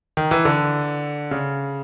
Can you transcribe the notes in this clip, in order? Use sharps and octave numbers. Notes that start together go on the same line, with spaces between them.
D#3
E3
D3
C#3